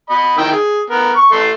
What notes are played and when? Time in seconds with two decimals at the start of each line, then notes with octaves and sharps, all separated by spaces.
0.10 D#5 B5
0.37 D#3 E4 G5
0.52 G#4
0.90 B3 A#4
1.16 C#6
1.32 A3 A5 C6